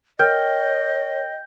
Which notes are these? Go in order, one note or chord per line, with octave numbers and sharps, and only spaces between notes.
A#4 C#5 D#5 G5 F6